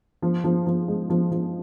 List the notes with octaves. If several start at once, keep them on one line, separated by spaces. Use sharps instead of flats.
F3
F3
F3
G#3
F3
F3